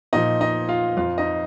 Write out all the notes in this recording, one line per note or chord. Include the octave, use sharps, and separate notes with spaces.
A#2 F3 D#4 D#5
D#4 D#5
F4 F5
F2 F3 F4 F5
D#4 D#5